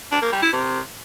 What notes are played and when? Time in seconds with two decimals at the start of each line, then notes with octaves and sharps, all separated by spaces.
0.12 D4
0.22 A#3
0.32 G3
0.43 E4
0.53 C3